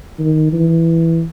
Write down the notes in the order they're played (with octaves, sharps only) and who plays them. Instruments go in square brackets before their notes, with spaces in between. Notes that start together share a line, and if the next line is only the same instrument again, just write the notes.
[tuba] D#3
E3